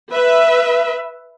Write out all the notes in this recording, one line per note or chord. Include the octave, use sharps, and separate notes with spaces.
B4 E5